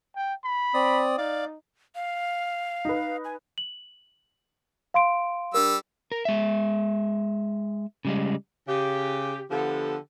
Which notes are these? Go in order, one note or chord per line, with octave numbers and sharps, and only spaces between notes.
G5
B5
C4 D5 D#6
D#4 D5 F5 D6
F5
D#4 B4
G#5
F#7
F5 C6 D7
G3 D4 A#4 E6
A#4
G#3 E5
C#3 G3 G#3
C#3 G4
D3 F3 B3 G4 A4